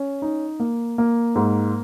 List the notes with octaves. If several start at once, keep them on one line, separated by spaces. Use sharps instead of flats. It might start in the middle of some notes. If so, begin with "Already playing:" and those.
Already playing: C#4
D#4
A#3
A#3
G#2